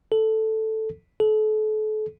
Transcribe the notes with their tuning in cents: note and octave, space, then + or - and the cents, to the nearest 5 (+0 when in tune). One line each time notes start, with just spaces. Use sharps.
A4 +0
A4 -35